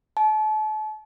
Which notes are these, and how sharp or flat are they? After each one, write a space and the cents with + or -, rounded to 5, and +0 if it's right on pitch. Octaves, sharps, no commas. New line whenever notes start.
A5 -35